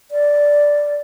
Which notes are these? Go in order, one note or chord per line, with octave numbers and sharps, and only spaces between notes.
D5